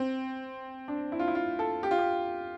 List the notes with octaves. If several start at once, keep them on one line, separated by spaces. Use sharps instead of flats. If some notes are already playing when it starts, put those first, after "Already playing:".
Already playing: C4
D4
E4
F4
E4
F4
A4
G4
F4
G4